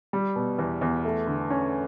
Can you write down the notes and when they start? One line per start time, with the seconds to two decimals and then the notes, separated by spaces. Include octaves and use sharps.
0.13 G3
0.36 B2
0.58 E2
0.81 E2
1.05 A3
1.27 D3
1.50 C#4